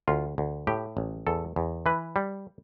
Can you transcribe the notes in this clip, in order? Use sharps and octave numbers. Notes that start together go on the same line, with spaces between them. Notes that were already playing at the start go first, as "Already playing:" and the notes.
D2 F4
D2
A2 G4
A1
E2 A4
E2
E3 B4
G3